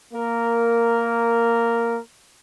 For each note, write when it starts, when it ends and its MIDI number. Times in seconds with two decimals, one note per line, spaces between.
0.13 1.98 58
0.13 1.98 70